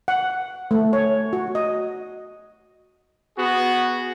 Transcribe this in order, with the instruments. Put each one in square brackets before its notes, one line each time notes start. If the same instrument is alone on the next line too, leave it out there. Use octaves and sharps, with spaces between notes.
[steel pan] F#5
A3
C#5
F#4
D#5
[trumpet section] B3 F#4 G#4